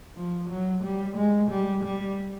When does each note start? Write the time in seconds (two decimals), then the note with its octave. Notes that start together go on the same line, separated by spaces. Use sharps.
0.17 F3
0.50 F#3
0.83 G3
1.17 G#3
1.50 G3
1.83 G3